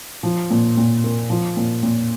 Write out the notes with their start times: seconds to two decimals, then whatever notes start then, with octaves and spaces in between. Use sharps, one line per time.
0.23 F3
0.50 A#2
0.77 A#2
1.04 A#3
1.30 F3
1.57 A#2
1.83 A#2